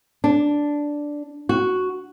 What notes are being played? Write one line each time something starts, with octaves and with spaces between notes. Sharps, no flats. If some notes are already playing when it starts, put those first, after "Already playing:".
D4
F#4